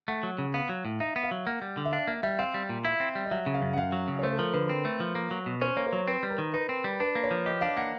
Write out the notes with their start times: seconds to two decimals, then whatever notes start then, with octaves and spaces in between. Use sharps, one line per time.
0.08 A3 F#5
0.23 F#3
0.38 C#3
0.54 B3 F5
0.69 F#3
0.85 A2
1.00 D#4 E5
1.16 B3
1.23 F5
1.31 F#3
1.46 A#3 F#5
1.62 G3
1.77 D3
1.85 E5
1.92 D4 F5
2.08 A#3 E5
2.23 G3 E5
2.39 C4 F5
2.54 G3
2.69 A#2
2.85 E4 E5
3.00 C4
3.15 G3
3.25 D#5
3.31 F#3 E5
3.46 C#3
3.54 F5
3.62 F#2
3.73 F#5
3.77 F#2 F5
3.92 F#3
4.08 C#3
4.19 C#5
4.23 A3 C5
4.33 A4
4.38 F3 A#4
4.54 D3 B4
4.69 C4
4.85 A3
5.00 F3
5.15 A#3
5.31 F#3
5.46 B2
5.61 C#4 C5
5.77 A#3 C#5
5.87 C5
5.93 F#3 C#5
6.08 C4 B4
6.23 G3
6.30 A#4
6.38 D#3
6.54 D#4 B4
6.69 C4
6.84 G3
7.00 D4 B4
7.15 A#3
7.24 C#5
7.31 F3
7.46 G4 D#5
7.61 D4 F5
7.77 A#3 F#5